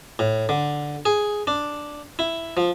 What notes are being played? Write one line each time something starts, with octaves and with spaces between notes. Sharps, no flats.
A2
D3
G#4
D4
E4
F3